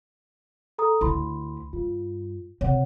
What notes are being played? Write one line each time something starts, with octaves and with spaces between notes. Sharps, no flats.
A4 A#5 D#6
D2 D3 E4 B5 C6
G2 F4
C3 C#5 F#5